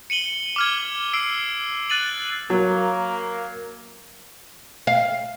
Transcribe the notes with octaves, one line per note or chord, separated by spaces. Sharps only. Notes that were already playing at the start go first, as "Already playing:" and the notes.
C#7 D#7 F#7 G7
D6 F6 G#6
E6 C7 D7
F#6 A6 D#7 F#7
F#3 A#3
F5